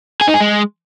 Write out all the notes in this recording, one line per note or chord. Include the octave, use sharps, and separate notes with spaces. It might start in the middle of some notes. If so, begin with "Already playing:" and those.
G#4
D#4
G#4
G#3